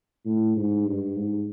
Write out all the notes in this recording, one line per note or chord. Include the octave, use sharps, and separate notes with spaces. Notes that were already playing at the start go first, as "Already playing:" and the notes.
A2
G#2
G2
G#2